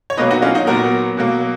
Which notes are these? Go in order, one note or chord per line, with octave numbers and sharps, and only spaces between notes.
C#5
B2 F#3 A#3 B4 D#5
D#4 F#4
C#4 F4
D#4 F#4
A#2 F#3 B3 F#4 A#4
B2 F#3 A#3